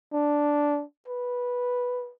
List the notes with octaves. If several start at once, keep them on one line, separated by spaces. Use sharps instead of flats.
D4
B4